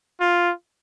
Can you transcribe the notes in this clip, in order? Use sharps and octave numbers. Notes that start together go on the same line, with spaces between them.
F4